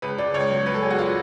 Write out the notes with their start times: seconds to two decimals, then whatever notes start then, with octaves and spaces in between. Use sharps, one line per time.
0.02 C#2 B4
0.18 C#2 D5
0.34 C#2 C#5
0.51 F#3
0.66 F#3 B4
0.75 A4
0.82 F#3 G#4
0.90 F#4
0.99 F4